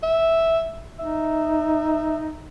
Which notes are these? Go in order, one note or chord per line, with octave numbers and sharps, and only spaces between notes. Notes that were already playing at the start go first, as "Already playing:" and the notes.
E5
D#4 E5